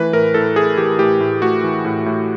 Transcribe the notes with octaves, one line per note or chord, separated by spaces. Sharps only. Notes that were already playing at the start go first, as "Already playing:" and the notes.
Already playing: E3 A3 B4
A2 A#4
A2 A4
A3 G#4
E3 G4
A2 G4
A2
A3 F#4
E3
A2
A2